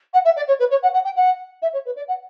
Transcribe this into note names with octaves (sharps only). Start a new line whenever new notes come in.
F#5
E5
D5
C#5
B4
C#5
F#5
F#5
G5
F#5
E5
C#5
B4
D5
F#5